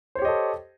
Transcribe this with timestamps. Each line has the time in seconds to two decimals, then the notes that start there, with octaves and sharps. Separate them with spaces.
0.15 C5
0.19 C#5
0.22 G4
0.25 D#5
0.28 A4